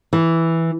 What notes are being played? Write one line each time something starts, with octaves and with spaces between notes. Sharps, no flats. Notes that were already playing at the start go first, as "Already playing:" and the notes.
E3